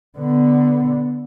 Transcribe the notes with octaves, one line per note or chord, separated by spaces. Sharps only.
D3 B3